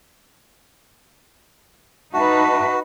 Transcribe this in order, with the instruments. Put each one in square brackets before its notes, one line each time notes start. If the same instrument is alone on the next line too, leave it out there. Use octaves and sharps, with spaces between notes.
[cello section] D#4 B4 [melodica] F#4 [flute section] E5 A5